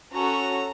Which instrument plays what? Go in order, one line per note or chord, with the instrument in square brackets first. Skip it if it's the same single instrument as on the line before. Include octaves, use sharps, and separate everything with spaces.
[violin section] C#4 F#4 A4 A#5